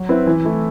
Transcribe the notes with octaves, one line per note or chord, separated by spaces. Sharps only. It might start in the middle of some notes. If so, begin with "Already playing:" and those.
Already playing: F#3
C4 E4 B4
E3
A3 E4